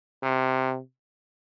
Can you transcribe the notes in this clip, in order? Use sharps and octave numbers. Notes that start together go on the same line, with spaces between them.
C3